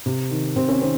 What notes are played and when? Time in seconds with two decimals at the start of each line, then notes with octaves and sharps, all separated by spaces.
0.06 C3
0.31 D#3
0.56 C3 C4
0.68 C#4
0.81 D#3 C4